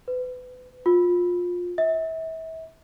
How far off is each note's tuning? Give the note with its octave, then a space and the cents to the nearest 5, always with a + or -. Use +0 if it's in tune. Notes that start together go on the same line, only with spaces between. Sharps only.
B4 +30
F4 +20
E5 -35